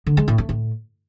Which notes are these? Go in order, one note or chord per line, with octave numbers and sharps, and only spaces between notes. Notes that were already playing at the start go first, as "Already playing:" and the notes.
D3
G#3
A2
A3
A2